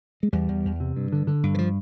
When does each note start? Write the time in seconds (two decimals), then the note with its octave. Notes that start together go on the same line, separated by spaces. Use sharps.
0.23 G#3
0.33 E2 G3
0.49 E2
0.65 E2
0.80 C3
0.96 G2
1.12 D3
1.27 D3
1.43 G2
1.54 E3
1.58 F3